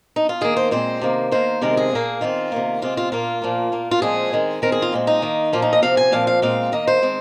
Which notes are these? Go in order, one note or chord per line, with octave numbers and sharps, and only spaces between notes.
D#4
F4
D#3 A#3 G#4
C5
A#2 G#3 C4 C5
C3 D#3 A#3
D#3 A#3 C5
C3 D#3 G#3 C4 A#4
G#4
A#2 A#3
D#3 C4 F4
C3 D#3 A#3
C3 G#3 C4 F4
F4
A#2 A#3 F4
A#2 F3 A#3
A#2 A#3
F4
A#2 F3 G#3 C4 G#4
D#3 G#3 C4
D#3 C4 A#4
G#4
F4
A#2 G#3 C4
D#4
D#3 A#3
A#2 F3 A#3 F4
D#4
D#5
C3 F3 C4 F5
G#5
A#2 F3 C4 F5
F5
A#2 G#3 C4 F5
D#3 A#3 D#5
C5
D#3 G#3 C4